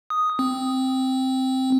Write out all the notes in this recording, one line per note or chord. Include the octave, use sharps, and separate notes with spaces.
D#6
C4